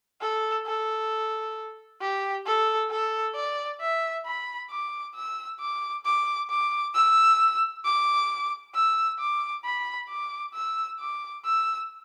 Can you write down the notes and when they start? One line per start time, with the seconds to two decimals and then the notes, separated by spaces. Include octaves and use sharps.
0.21 A4
0.66 A4
2.01 G4
2.46 A4
2.90 A4
3.36 D5
3.81 E5
4.25 B5
4.71 D6
5.15 E6
5.61 D6
6.05 D6
6.50 D6
6.95 E6
7.85 D6
8.74 E6
9.20 D6
9.65 B5
10.09 D6
10.54 E6
11.00 D6
11.44 E6